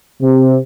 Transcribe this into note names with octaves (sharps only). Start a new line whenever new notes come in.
C3